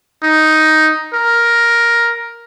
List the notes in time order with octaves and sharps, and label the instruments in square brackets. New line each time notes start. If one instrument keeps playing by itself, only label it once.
[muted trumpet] D#4
A#4